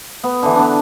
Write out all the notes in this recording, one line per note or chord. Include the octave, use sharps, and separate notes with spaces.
B3
D3 E3
B3 D4